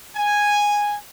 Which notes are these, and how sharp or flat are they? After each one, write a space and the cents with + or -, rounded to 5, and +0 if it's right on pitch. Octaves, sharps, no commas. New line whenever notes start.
G#5 -5